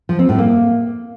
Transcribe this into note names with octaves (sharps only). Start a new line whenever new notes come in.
F3
C4
A2
A#3